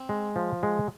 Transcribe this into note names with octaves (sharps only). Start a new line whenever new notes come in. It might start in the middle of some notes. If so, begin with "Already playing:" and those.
Already playing: C4
G#3
F3
G#3